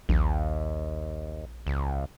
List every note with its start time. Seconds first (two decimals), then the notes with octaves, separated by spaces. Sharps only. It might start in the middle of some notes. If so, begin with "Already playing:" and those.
0.09 A#1 D#2
1.67 C#2